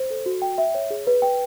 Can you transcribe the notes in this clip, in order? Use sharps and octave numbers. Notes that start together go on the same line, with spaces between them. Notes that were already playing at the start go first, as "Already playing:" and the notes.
Already playing: C5
A4
F#4
G5
E5
C#5
G#4
B4
G5